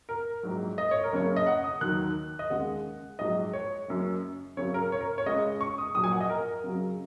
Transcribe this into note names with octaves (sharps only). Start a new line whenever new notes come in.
A#4
A#1 G#2 F#3
D#5
C#5
A#4
F#1 F#2 C#3 C#5
D#5
F#5
D#6
D#2 D#3 F#3 F#6
D#5
D#2 C#3 G#3 F#5
A#1 G#2 F#3 D#5
C#5
F#1 F#2 F#3
F#2 C#3 F#3 C#5
A#4
C#5
A#4
C#5
C#2 C#3 G#3 D#5
C#6
D#6
A#1 A#2 F#3 D#6
G#5
F#5
D#5
A#4
F#2 C#3 F#3